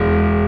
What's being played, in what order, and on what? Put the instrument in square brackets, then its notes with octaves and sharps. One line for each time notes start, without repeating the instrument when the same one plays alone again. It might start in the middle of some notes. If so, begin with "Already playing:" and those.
Already playing: [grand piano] E1